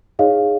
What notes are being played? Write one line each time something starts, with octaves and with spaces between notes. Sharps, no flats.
D#4 G#4 C#5 D#5 F5